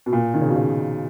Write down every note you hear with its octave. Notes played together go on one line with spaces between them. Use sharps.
B2
A#2
D#3
C#3
B2
C#3